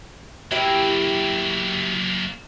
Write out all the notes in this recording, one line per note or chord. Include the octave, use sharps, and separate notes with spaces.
F#3 A#3 E4 G4 E5